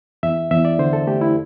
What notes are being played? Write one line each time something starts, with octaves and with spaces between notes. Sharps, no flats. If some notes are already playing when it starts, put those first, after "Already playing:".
E2 E5
E2 E5
D5
D3 C5
A4
A3 G4
E4